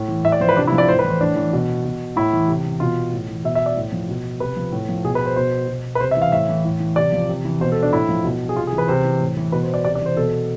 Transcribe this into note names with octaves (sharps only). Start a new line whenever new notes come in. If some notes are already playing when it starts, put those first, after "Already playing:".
Already playing: A2
E3
A2 E5
D5
F3 C5
B4
C3 D4
E4
F3
D5
A2 C5
B4
E3 C5
A2 D4
E3
B2
B2
A2 E4
E3
C3
E3
B2 F4
A2
E3
B2 E5
E5
D5
A2
F3
B2
C3 B4
F3
A2
F3
B2 G#4
B4
C5
B2 C5
B2
B4
C3 C5
E5
E3
F5
A2 E5
E3
A2
E3
C3 D5
F3
C3
E3
B2 C5
A4
D4
A2 E4
F3
B2
G#4
C3 F4
G#4
E3
B4
C3 C5
E3
A2
E3
B2 B4
C5
D5
C3 D5
D5
E3 C5
B2 A4